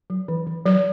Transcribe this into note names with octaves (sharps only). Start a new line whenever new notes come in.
F#3
E3
E3
F#3